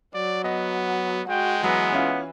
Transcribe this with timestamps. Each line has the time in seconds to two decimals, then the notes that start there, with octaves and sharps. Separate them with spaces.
0.14 F#3 D5
0.44 B3 D#5
1.29 G#3 F#4 G5
1.64 E3 F#3 B3
1.93 C#4 E4 F4